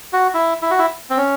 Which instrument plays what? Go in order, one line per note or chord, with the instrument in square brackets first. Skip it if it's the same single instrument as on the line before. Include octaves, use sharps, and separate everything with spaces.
[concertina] F#4
E4
E4
F#4
E4
C4
C#4